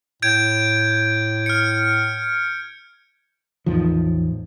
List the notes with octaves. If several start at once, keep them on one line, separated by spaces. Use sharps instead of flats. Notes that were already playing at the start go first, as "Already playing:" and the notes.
A2 G6 G#6 D7
F6 C#7
A1 E2 D#3 F3